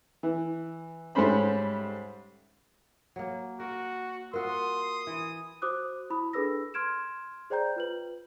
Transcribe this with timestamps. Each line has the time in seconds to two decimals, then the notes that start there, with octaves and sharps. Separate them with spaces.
0.23 E3
1.15 G#2 G3 A3 C#4 C5 B5
3.16 F#3 A#3
3.60 F#4 A#4
4.34 F4 F#4 A#4 E5 C6 D#6
5.07 E3
5.62 F#4 C5 D6 D#6 F#6
6.10 E4 B5 D#6
6.33 D4 G#4 A4 B4 E6 A#6
6.74 C6 F6 G#6 D7 E7
7.50 G#4 C5 D5 G5 A#5 G6
7.76 F4 B4 F#7